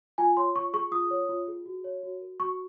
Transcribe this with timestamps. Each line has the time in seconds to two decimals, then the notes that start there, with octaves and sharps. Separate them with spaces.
0.18 F4 G#5
0.37 C#5 C6
0.56 F4 C#6
0.74 G#4 C#6
0.92 F4 D#6
1.11 C#5
1.29 F4
1.48 G#4
1.66 F#4
1.84 C#5
2.03 F#4
2.21 A#4
2.40 F#4 C#6